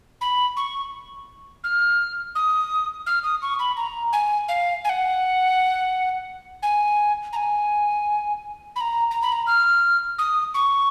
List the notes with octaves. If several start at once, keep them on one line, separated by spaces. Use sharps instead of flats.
B5
C#6
F6
D#6
F6
D#6
C#6
B5
A#5
G#5
F5
G#5
F#5
G#5
A#5
G#5
B5
A#5
A#5
B5
A#5
F6
D#6
C#6